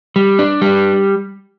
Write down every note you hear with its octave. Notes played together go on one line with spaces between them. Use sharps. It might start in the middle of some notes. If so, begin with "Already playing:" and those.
G3
D4
G3